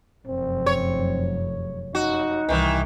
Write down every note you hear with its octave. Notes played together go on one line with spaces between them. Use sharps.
F1 F#2 C4
C#5
D#4 F#4
C2 D#3 E3